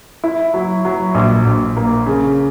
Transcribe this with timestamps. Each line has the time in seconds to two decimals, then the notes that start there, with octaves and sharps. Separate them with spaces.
0.24 E4
0.54 F#3
0.85 F#3
1.15 A#1
1.46 A#1
1.77 A#3
2.06 C#3